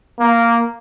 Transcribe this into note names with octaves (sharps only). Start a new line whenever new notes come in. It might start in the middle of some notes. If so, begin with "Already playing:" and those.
A#3